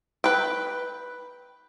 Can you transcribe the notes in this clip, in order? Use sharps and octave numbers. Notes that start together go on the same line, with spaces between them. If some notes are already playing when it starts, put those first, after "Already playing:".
B4 G5